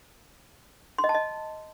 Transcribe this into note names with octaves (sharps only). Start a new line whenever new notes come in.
C6
D#5
A5
D#5